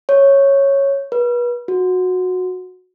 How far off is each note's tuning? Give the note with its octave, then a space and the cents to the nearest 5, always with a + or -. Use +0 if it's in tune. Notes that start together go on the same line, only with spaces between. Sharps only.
C#5 -5
B4 -35
F#4 -15